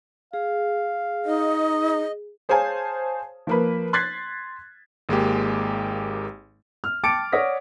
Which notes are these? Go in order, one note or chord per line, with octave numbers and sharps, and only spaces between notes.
G#4 F5
D#4 D#5
G#4 C5 C#5 F5 G#5 A5
F3 A#3 B4
C6 F#6 G#6 A6 B6 C7
G#1 G#3 A#3 G4
F6
G5 A5 D6 A6 C#7 D7
C#5 D5 F#5 D#6 A#6 B6